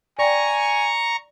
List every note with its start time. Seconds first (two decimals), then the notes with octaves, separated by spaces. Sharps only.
0.19 D5 G5 G#5 A#5 C#6